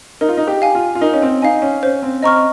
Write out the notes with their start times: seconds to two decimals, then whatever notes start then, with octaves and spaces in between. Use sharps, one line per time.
0.21 D#4 A#4
0.29 F4
0.38 D#4
0.47 G4
0.62 F5 G#5
0.75 F4
0.95 F4
1.01 D#4 A#4
1.13 C#4
1.22 C4
1.42 D#4 F5 G#5
1.62 C#4
1.83 C#4 C5
2.03 C4
2.23 C4 D#5 A#5 C#6 F6